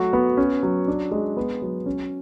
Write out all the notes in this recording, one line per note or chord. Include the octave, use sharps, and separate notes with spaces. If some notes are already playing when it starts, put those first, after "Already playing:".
Already playing: F#3 A3 F#4
B3
C#4
F#3
D4
G#3
B3
F#3
C#4